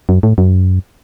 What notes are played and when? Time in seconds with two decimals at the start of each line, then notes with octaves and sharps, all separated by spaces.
0.09 F#2
0.23 A2
0.38 F#2